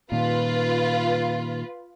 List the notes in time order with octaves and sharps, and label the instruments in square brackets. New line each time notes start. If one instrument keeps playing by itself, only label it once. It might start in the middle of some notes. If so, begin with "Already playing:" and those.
[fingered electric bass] A#2 D#3 [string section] F4 B4